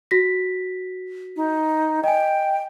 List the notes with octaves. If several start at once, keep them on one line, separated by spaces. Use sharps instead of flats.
F#4 A#6 B6
D#4
D#5 G5 G#5